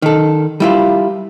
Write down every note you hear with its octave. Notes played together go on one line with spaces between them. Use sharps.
D#3 A4
G3 E4 F4